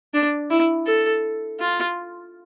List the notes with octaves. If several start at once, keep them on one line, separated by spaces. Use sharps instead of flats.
D4
E4
A4
F4